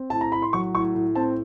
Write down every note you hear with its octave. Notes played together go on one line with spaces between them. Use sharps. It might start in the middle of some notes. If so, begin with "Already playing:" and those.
Already playing: C4
A2 A5
A#5
A2 B5
C6
F#3 C#6
A2 C#6
A2
C4 A5